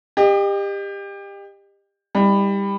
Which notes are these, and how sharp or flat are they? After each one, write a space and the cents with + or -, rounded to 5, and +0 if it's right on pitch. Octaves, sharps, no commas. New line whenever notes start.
G4 +25 D#5 -30
G3 +20 E4 -45